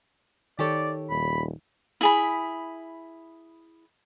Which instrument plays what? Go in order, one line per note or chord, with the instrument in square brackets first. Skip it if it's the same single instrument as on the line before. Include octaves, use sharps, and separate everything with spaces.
[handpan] D#3 [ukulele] G4 A4 C#5 [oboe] D5
[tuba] D#1 [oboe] B5
[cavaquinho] E4 G#4 B5